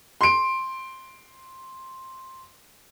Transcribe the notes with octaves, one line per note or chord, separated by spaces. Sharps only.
C6 D7